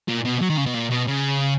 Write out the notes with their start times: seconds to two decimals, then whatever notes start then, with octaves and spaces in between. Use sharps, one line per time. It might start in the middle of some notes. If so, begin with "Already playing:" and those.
0.08 A#2
0.25 B2
0.41 F#3
0.50 D#3
0.58 C#3
0.66 B2
0.74 A#2
0.91 B2
1.07 C#3